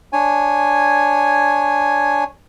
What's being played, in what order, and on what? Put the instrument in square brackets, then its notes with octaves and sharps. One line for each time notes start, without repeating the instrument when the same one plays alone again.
[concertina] D4 C#5 G#5